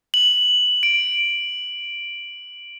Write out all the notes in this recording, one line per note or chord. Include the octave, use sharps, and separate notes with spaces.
F#7
D7